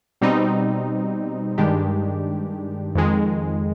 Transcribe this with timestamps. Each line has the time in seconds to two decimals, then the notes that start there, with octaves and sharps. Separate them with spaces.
0.21 B2 G3 C4 D#4
1.58 G2 D#3 G#3 D4 G4
2.95 F2 D#3 G#3